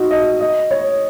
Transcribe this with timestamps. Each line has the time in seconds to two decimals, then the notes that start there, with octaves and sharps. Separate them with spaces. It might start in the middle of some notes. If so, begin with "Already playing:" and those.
Already playing: D#4 F#4
0.11 D#5
0.40 D#5
0.71 C#5